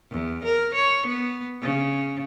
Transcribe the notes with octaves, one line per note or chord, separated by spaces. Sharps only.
E2
A#4
C#5
B3
C#3